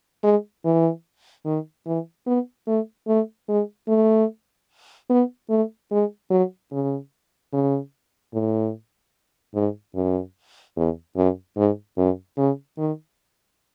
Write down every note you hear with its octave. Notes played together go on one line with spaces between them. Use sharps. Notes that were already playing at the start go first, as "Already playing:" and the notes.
G#3
E3
D#3
E3
B3
A3
A3
G#3
A3
B3
A3
G#3
F#3
C#3
C#3
A2
G#2
F#2
E2
F#2
G#2
F#2
C#3
D#3